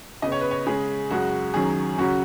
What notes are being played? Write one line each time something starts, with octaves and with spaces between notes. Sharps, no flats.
C#3 B3 D#5
C#5
B4
C#5
C#3 G#3 C#4 G#4
F#2 C#3 G#3 C#4 F#4
F#2 D#3 F#3 C#4 G#4
C#3 F#3 C#4 F#4